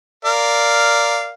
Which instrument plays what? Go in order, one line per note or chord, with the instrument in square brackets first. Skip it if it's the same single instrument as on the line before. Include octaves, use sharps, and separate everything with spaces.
[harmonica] A#4 D5 F5